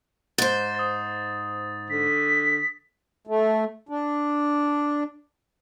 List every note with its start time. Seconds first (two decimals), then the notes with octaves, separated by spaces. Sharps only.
0.38 G#2 C5 A6
0.75 D#6 A6
1.90 D3 B6
3.27 A3
3.89 D4